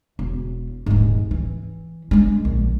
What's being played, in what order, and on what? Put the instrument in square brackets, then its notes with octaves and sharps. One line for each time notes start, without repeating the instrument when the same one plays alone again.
[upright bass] E1
D#1 G#2
E3
G#3 D4
A#1